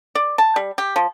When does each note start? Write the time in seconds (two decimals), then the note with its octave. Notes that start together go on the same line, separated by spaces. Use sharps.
0.15 D5
0.38 A5
0.56 G3
0.78 G4
0.96 F3